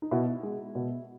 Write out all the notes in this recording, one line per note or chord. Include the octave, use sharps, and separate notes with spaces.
D#4
B2 E4
G#3
B2